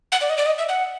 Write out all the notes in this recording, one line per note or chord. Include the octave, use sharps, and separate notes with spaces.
F#5
D5
D#5
D5
D#5
E5
F#5